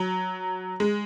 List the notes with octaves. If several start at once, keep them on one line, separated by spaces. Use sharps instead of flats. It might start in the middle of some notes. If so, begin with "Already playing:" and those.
Already playing: F#3
G#3